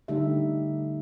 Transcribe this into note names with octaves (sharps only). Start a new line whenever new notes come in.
D3 G3 A3 D#4 G4 E5